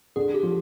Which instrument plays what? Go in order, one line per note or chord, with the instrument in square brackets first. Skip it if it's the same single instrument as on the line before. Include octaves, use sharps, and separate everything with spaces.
[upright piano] D3 [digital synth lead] G#4
[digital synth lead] G4
[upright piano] F3